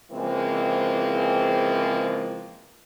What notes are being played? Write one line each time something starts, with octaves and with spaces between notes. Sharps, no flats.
C#3 E3 F3 G#3 A#3 C4